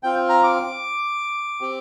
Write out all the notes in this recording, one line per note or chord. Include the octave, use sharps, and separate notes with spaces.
C4 F4 G5
A#5
D6
C4 G4